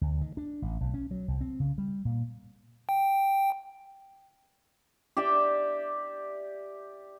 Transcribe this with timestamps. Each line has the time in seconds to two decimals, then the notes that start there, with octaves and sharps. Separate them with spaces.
0.01 D2
0.21 D#3
0.37 D4
0.62 A1
0.81 B1
0.94 C#4
1.11 F#3
1.28 C2
1.41 C4
1.60 C#3
1.78 G3
2.05 A#2
2.89 G5
5.17 G4 D5 E5 G5